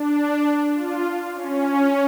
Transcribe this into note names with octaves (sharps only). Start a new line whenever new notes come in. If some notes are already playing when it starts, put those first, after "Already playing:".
Already playing: D4
F4
C#4